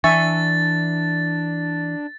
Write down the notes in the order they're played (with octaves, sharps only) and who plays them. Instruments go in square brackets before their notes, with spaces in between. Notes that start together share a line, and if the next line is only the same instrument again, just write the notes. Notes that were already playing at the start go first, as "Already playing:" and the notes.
[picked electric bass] E3 [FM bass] D4 [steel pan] E5 G#5 C#6 [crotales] A6